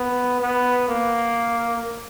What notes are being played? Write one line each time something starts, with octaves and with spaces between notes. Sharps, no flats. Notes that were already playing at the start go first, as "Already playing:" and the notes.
Already playing: B3
B3
A#3